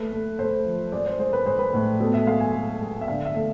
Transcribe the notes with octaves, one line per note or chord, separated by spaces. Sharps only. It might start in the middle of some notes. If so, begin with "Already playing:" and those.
Already playing: A3 B4
A3
A3 C5
F3
G#3 D5
C5
G#3 C5
B4
G#3 C5
B4
A2
B2 A4
E5
G#3 F5
G#5
G#3
G#3
E5
D3 F5
E5
A3